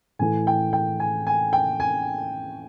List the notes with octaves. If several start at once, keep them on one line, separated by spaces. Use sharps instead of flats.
A2 E3 A3 G#5
G5
G5
G#5
G#5
G5
G#5